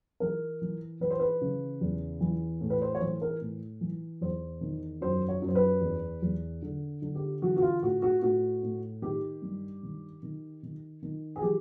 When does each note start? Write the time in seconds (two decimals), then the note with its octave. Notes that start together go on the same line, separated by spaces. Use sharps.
0.20 E3 A#4
0.62 E3
1.00 E3 B4
1.11 C5
1.20 B4
1.41 C#3
1.81 E2
2.21 E3
2.61 A2
2.70 B4
2.82 C5
2.95 C#5
3.01 E3 C5
3.22 A#4
3.41 A2
3.81 E3
4.21 E2 C5
4.61 D#3
5.01 F#2 C5
5.29 C#5
5.42 F#2
5.48 C5
5.55 B4
5.81 E2
6.22 E2
6.62 D3
7.02 D3
7.15 G4
7.42 E3 F#4
7.56 F#4
7.62 F4
7.82 A2 F#4
8.02 F#4
8.22 A2 F#4
8.63 A2
9.02 D#3 G4
9.42 G2
9.83 D#3
10.23 D#3
10.63 D#3
11.02 D#3
11.36 G#4
11.42 E3 G4